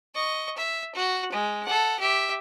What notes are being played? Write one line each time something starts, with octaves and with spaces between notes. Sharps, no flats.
D#5 C#6
E5
F#4
G#3
A4 F#5
G4 E5